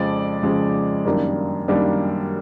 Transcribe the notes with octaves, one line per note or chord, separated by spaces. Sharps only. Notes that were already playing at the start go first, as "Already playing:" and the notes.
Already playing: F2 C#3 F3 G#3 D5
F2 C#3 F3 G#3
F#2 D#3 G3 A#3 D4
F#2 D#3 G3 A#3 D4